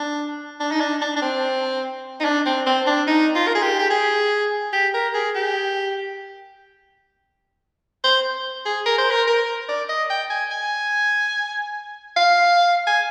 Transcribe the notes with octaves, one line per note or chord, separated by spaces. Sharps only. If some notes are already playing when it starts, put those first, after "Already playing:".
Already playing: D4
D4
D#4
D4
D4
D4
C4
D#4
D4
C4
C4
D4
D#4
F4
A#4
G#4
G4
G4
G#4
G4
A#4
G#4
G4
C5
G#4
A#4
C5
A#4
A#4
D5
D#5
G5
G#5
G#5
F5
G#5